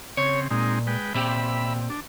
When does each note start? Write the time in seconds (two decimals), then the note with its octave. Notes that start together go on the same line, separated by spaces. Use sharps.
0.17 C#3 C4 C#5
0.51 A#2 G#3 C4 D#4
0.87 G#3 B4 G5
1.14 A#2 C4 G4 E5 B5
1.90 D4